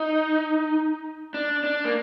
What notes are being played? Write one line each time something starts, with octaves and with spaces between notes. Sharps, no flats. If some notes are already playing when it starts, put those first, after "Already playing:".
Already playing: D#4
D4
D4
A#3